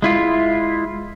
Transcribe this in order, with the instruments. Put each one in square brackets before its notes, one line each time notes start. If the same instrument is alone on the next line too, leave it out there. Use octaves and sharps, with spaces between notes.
[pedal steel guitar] G#3 E4 F4